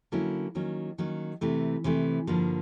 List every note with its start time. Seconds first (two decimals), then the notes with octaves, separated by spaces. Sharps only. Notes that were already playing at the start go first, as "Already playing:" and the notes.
0.12 D3 F#3 A#3 C#4 E4
0.55 D#3 F#3 A#3 C#4
0.98 D#3 F#3 A#3 C#4
1.41 C3 E3 A3
1.84 C3 E3 A3
2.27 G2 D3 F3 A#3 D4